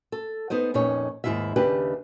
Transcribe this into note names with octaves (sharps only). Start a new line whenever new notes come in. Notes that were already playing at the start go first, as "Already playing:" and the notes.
A4
B3 D#4 C5 D#5
F2 A#2 C#4 D#4 C#5
D#2 G#2 C3 E4 F4 E5
D#2 C#3 D4 G4 B4 E5